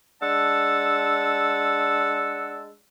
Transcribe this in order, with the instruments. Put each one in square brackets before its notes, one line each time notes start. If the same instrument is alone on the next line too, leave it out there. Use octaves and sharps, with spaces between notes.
[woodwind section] G#3 D4 F#5 A5 E6